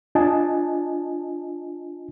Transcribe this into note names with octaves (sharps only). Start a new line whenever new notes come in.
D4 F4 D#5 G#5 A5